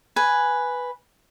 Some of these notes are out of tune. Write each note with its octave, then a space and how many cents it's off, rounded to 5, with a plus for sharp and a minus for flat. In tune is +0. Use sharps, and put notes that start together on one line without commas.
B4 +0 G#5 +0